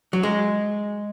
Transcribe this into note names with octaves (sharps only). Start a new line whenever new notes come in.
F#3
G#3